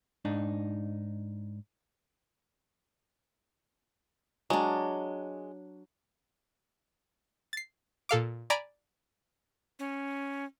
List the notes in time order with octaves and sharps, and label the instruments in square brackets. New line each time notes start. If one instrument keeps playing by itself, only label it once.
[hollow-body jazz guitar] G#2 D4 D#4
[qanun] F#3 D4 [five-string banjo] G#3
[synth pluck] A6 C7
A#2 A4 F5 D6
D5 G#5 A#5 B5 D6
[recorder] C#4